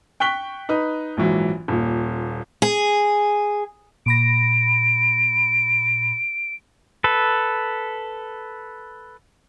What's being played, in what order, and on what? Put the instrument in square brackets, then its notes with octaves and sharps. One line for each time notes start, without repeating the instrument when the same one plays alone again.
[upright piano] G5 C#6 F#6 B6 G7
D#4 B4 D#6
A#1 G#2 E3 F#3
D#1 A#2
[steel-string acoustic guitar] G#4
[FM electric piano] A#2 B5 A#6 [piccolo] D7
[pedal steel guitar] A4 B4